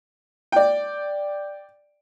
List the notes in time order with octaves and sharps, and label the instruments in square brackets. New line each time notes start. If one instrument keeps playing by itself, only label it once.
[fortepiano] D5 G5